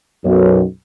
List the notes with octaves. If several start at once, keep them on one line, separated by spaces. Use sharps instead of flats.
B1 F#2